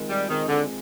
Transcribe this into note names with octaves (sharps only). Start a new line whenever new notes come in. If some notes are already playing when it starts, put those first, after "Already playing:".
Already playing: D#3 G#3 C4 F4
G3
D#3 G#3 C4 F4
D3